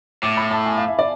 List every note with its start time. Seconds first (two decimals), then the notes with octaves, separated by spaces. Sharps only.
0.23 A2 D6
0.37 B5
0.51 A5
0.66 G#5
0.77 F5
0.88 E5
0.99 D5